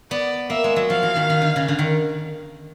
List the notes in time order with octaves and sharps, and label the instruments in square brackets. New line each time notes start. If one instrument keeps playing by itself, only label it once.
[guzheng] B3 [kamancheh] D5
[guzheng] A#3 [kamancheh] E5
[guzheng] G#3
F#3
[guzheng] F3 [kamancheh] F5
[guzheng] E3
D#3
D#3
D3
C#3
D3
D#3